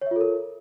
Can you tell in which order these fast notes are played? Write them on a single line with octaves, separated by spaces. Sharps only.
C#5 E5 F4 A4 A#4